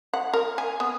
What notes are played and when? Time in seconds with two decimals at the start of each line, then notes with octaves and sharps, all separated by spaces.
0.14 F#5
0.33 A#4
0.58 G#5
0.80 B3